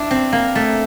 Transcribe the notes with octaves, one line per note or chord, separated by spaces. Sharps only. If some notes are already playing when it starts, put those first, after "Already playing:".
Already playing: D4 E4
C4
A#3
A3